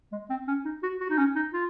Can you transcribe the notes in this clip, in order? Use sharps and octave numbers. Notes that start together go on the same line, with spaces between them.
G#3
C4
C#4
D#4
F#4
F#4
D#4
C#4
D#4
F4